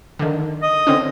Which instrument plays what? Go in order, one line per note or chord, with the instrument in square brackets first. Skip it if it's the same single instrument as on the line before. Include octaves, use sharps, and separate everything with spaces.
[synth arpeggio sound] D3 D#3
[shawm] D#5
[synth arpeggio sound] D3 C4 C#4